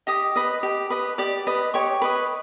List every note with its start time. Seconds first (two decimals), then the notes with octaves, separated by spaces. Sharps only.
0.07 G4 D#5 D#6
0.36 B4 D#5
0.63 G4
0.90 B4 D#5
1.18 G4 D5 D6
1.47 B4 D#5
1.74 G4 C#5 C#6
2.02 B4 D#5